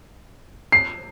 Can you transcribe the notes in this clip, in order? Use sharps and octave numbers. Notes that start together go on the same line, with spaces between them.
C7